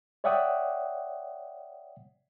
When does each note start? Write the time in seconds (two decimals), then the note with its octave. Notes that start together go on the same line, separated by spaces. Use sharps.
0.24 C#5 D5 E5 F#5 G5 D#6